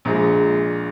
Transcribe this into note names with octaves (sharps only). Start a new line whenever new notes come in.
A#1 A#2 G#3 A#5